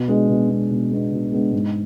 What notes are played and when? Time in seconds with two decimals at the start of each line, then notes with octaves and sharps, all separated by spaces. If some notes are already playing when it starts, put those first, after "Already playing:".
Already playing: B2
0.08 G#3 B3 D4
0.29 B2
0.49 G#3 B3 D4
0.70 B2
0.91 G#3 B3 D4
1.11 B2
1.32 G#3 B3 D4
1.53 G#2